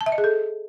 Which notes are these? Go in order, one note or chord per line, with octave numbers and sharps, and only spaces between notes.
A5
E5
D#5
G#4
A4